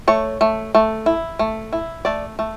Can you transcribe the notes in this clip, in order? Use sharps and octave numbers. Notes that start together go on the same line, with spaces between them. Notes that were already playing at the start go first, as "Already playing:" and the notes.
A3 C#5
A3
A3
E4
A3
E4
A3 D5
A3